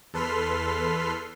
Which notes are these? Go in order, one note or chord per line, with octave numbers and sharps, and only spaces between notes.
E2 A4 B4 C6 F6 B6